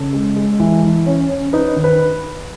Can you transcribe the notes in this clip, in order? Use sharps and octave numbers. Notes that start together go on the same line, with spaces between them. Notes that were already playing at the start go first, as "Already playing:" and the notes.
Already playing: C#3 A4
G#3
G#3
E3
E3
C#4
C#4
D#4 B4
D#3
B4